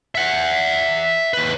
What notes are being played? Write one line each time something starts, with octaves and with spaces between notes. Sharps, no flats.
E5 F#5
D#2 B4